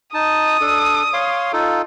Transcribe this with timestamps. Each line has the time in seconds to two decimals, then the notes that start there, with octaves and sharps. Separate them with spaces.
0.14 D#4 A5 D#6
0.61 D4 A4
1.13 C#5 F5 C6
1.53 D#4 F4 A4